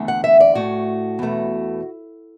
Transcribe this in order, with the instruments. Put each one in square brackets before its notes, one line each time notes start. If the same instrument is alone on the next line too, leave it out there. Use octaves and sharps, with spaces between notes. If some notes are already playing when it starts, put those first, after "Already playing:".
Already playing: [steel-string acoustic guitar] E2 D3 A3
F#5
E5
D5
A2 A3 F#4
E2 B2 A3